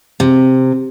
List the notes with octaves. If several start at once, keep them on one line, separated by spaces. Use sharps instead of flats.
C3